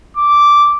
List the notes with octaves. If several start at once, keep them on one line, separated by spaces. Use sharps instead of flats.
D6